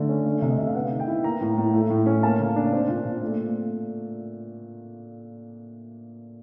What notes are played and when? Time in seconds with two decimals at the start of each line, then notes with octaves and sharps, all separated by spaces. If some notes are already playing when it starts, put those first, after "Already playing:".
Already playing: D3 A3
0.09 C#4
0.26 A3
0.42 C3
0.50 D#5
0.58 C3 E5
0.67 F5
0.75 B3 F#5
0.91 D#3
1.00 G5
1.08 E4
1.24 A#3 A#5
1.41 A2
1.57 A2
1.74 A3
1.90 A2
2.06 C#4
2.23 A#3 A5
2.40 C#3
2.56 D4
2.72 C4
2.89 A#2
3.05 A#2
3.22 A3